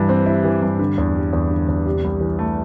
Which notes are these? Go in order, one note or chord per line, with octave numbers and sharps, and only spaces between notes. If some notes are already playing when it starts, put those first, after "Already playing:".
Already playing: G2 E3
C4
E4
E3
G2
D3
E2
G3
E2
D3
E2
C3
C2
E3
A3